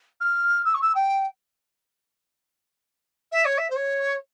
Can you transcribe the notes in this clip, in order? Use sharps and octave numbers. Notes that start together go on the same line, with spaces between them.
F6
E6
C#6
E6
G5
E5
C#5
E5
C5
C#5